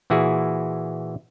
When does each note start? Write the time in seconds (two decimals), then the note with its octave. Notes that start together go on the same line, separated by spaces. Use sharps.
0.10 A#2 E3 E4 F#4 G#4